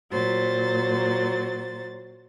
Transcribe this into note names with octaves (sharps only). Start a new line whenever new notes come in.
A#2 F#3 C5 A6